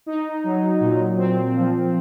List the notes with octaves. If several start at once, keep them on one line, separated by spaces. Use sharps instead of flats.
D#4
F#3
A#2
C4
F3